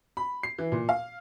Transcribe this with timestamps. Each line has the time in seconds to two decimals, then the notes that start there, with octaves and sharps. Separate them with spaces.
0.17 B5
0.43 C7
0.58 E3
0.72 A#2
0.89 F5